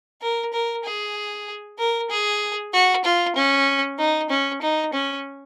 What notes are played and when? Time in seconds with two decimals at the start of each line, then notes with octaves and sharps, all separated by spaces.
0.22 A#4
0.53 A#4
0.84 G#4
1.79 A#4
2.10 G#4
2.73 F#4
3.05 F4
3.36 C#4
3.99 D#4
4.30 C#4
4.62 D#4
4.93 C#4